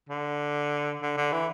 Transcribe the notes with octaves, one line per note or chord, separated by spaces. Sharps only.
D3
D3
D3
E3